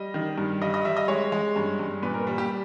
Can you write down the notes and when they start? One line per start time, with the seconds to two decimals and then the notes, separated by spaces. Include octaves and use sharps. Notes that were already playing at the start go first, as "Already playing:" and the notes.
Already playing: G3 D#5
0.14 D#3
0.38 G2
0.61 G3 D#5
0.74 D#5
0.85 G3 E5
0.97 D#5
1.08 G#3 C#5
1.32 G#3
1.56 G2
1.79 G2
2.02 A#2 B4
2.14 A#4
2.27 G3
2.38 G4